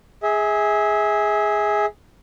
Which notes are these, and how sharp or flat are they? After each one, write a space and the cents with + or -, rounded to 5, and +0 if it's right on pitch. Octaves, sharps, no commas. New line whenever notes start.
G#4 +0 E5 -30